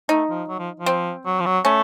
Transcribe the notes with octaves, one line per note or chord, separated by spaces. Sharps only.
A3 D#4
F3
F#3
F3
F3
C4
F#3
F3
F#3
A3 C#4